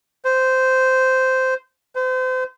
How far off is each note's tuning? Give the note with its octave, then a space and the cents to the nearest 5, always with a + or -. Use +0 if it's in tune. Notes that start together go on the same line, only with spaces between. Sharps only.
C5 -10
C5 -35